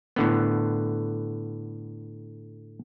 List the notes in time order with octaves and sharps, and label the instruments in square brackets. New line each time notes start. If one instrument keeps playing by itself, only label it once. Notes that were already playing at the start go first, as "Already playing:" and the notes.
[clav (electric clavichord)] A2 D3 B3